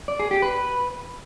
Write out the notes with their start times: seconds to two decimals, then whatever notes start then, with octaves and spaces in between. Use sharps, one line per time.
0.08 D5
0.20 G#4
0.31 G4
0.42 B4